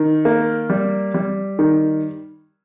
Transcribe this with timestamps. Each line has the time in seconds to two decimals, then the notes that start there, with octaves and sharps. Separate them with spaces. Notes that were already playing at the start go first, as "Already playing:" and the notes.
Already playing: D#3
0.25 A#3
0.70 G3
1.14 G3
1.59 D#3